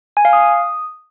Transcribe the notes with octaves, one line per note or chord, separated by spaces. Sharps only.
G#5
F5
D#6